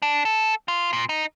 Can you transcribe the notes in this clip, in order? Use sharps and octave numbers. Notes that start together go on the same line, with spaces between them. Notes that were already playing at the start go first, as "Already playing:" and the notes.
D4
A4
F4
A#2
D#4